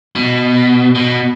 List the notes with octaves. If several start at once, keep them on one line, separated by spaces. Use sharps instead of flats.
B2
B2